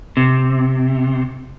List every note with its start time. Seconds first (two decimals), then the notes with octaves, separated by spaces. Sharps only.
0.17 C3